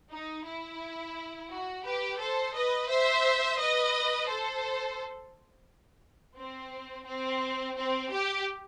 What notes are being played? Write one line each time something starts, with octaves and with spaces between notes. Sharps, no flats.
D#4
E4
F#4
G4 B4
A4 C5
B4 D#5
C5 E5
B4 D#5
A4 C5
C4
C4
C4
G4